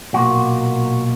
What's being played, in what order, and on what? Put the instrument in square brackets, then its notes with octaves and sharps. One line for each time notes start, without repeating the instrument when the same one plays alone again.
[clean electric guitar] B1 A#2 A#3 F#4